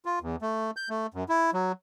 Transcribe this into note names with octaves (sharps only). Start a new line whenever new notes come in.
F4
E2
A3
G6
A3
F#2
E4
F#3